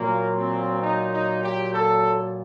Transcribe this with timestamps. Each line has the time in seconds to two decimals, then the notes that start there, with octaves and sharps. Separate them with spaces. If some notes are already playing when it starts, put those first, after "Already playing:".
Already playing: A#2 F#3 A#3
0.36 C4
0.82 D#4
1.13 D#4
1.43 G4
1.73 A4